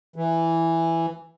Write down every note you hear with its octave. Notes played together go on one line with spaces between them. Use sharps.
E3